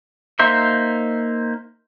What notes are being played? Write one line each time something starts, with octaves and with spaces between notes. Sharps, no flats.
A#3 D#4 C5 E5